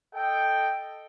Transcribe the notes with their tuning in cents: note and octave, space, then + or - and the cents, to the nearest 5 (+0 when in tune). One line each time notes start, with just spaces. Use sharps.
A4 +0 D#5 -10 G5 +0